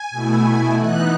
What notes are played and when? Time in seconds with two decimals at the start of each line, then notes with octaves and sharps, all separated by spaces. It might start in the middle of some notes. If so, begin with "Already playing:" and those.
Already playing: G#5
0.11 B2 A3 E4
0.77 E3 B3 D#4 F#6